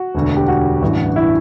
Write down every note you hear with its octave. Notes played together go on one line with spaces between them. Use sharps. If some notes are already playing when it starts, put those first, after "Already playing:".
Already playing: F#4
E1 D2 D3
G4
F#4
A1 G2 E3
E4